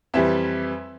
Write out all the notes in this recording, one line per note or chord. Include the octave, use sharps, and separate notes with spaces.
F2 E3 G3 E5